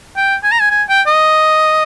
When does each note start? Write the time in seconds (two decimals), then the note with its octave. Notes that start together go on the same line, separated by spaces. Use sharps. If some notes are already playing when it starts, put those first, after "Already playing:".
0.17 G5
0.44 G#5
0.52 A#5
0.60 G#5
0.70 G#5
0.89 G5
1.07 D#5